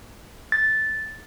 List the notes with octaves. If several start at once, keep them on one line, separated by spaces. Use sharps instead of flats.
A6